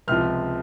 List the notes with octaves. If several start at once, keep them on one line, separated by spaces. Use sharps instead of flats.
C#2 C3 F3 F6